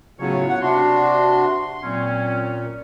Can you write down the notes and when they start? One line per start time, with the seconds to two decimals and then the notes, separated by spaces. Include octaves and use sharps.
0.20 A2 C#3 F#3 B3 F4 C#5
0.49 F#5
0.62 C3 D4 F#4 C6
1.83 A#2 F#3 C4 C#4